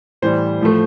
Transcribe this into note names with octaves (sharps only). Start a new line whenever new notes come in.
A2 E3 G3 C5
A2 F3 A3